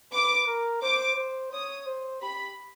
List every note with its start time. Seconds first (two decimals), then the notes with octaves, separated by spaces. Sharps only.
0.12 B4 D6
0.47 A#4
0.82 C5 D6
1.16 C5
1.52 C#5 D#6
1.86 C5
2.22 G4 B5